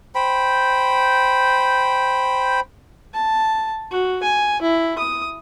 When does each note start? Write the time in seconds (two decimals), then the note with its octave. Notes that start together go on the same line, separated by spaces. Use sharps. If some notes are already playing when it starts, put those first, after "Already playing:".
0.15 C5 G5 B5
3.14 A5
3.91 F#4
4.23 G#5
4.62 E4
4.98 D#6